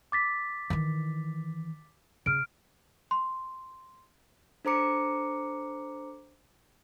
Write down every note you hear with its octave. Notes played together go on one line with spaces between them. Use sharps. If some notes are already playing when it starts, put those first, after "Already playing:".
D6 A6 B6
D#3 E3
C#3 F6 D7
C6
D4 A4 C5 A#5 D6 C#7